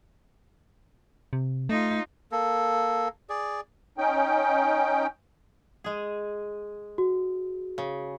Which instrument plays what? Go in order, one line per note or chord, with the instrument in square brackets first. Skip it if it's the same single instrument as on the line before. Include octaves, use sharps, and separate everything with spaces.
[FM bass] C3
[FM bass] A3 [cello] D#4 F4
[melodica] A#3 A4
G#4 D5
[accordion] C#4 D#4 G5
[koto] G#3 G#4
[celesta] F#4
[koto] C#3